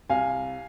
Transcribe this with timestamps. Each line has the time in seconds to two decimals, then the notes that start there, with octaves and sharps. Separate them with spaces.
0.09 C2 F5 G#5